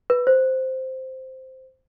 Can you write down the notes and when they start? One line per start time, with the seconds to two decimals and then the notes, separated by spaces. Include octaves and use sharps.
0.10 B4
0.27 C5